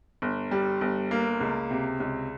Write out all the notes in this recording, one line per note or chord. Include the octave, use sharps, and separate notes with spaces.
G1
G3
G1
A#3
C#2
C3
C#2